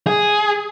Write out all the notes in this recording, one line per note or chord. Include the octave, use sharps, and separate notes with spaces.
G#4